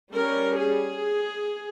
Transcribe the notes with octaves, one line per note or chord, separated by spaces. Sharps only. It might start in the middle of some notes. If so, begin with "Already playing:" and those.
G3 C#4 A#4
G#4